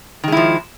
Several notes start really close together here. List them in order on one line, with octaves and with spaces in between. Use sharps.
D#3 G#3 E4 F3